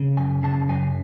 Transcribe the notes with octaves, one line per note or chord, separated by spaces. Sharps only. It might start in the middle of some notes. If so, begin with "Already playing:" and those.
Already playing: C#3
F#2 G#5
C#3 A5
F#2 G#5